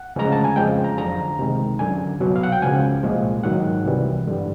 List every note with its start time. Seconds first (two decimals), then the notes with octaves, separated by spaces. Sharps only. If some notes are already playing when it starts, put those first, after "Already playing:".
Already playing: F#5
0.16 D2 C#3 F3 G#3 A#5
0.32 A5
0.44 G#5
0.56 F2 C#3 F3 G#3 G5
0.84 A#5
0.97 F#2 D3 F3 A#5
1.38 C#2 C3 D#3 G#3
1.79 F#2 D3 F#3 G#5
2.20 C2 B2 F#3
2.36 F5
2.43 F#5
2.52 G5
2.62 C#2 C#3 F3 G#5
3.03 C2 A#2 F3 G#3
3.43 G#2 D#3 F#3 F#5
3.85 C2 C3 E3 G3
4.27 G2 D3 G3